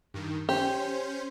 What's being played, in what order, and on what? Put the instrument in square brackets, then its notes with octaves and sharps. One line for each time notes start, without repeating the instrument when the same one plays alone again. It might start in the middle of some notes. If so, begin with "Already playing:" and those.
[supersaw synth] G2 D#3
[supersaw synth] C#4 C5 [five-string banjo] G4